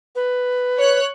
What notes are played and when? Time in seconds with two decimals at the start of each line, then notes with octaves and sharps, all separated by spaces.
0.16 B4
0.78 C#5 F#6